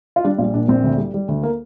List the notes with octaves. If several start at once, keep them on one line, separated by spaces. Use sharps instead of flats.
F4
G3 D4
A#1 F4
A#2 D4
A#1 C4
D2
G3
G3
D2
A#3